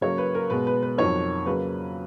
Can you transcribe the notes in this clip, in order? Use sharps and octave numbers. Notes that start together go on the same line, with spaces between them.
C#3 F#3 A#3 C#5
B4
A#4
B2 G#3 B3 B4
B4
B4
F2 D#3 F#3 C#5
C#3 F#3 A#3 B4